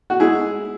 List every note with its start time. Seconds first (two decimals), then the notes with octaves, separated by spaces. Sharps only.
0.10 F#4
0.19 G#3 E4 G#4